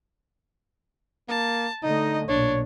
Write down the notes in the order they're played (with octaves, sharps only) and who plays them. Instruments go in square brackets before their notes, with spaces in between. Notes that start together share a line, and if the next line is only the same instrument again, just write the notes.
[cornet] A#3 [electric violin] A5
[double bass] D3 A3 [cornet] D#4 [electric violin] D#5
[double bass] B1 A#2 [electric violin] D4 [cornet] C#5